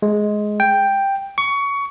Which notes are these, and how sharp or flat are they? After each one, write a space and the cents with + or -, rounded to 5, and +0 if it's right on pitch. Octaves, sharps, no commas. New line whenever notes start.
G#3 +10
G5 +5
C#6 +20